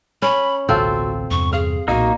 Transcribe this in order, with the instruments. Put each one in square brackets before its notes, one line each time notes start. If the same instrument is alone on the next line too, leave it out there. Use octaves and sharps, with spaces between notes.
[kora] C#4 [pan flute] B5
[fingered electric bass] A1 D2 B2 [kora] C4 F4 A4 [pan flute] F#4
[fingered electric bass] E2 G2 C3 [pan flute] C#6
[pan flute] G#4 [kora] F5
[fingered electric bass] B1 A#2 [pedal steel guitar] A#3 D#4 [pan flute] F#4